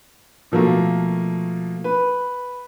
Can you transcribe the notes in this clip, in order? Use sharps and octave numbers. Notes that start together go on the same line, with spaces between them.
B2 F3 A3 A#3
B4